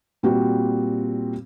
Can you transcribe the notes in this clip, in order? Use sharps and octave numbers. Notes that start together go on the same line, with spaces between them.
A#2 G3 C4 F#4